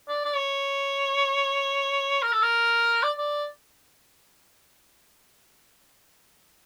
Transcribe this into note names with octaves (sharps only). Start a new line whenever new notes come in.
D5
D5
C#5
A#4
A4
A#4
D5
D5